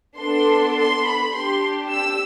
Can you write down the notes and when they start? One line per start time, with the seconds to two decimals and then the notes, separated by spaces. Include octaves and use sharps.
0.17 B3 D4 A4 C6
0.75 C6
1.04 B5
1.33 D4 G4 C6
1.90 E6